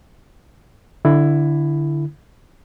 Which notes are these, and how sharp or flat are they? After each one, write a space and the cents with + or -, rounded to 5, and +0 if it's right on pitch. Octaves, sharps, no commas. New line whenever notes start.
D3 +0 E4 +10